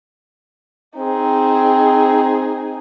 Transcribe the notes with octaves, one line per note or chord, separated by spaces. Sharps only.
C4 D#4 G#4